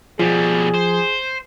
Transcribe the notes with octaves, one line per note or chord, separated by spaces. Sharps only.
B2 F3 G3 G#4
C5